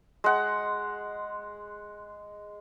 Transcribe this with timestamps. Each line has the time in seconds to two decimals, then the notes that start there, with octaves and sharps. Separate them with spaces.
0.24 G#3 F#5